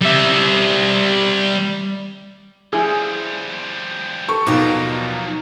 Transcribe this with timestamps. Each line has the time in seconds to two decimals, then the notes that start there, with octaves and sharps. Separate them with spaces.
0.02 G3 E5
2.73 F3 G3 E4 G#4
4.28 A4 C#6
4.46 D#2 B2 F3 F#3 D#4 F4 D5 D6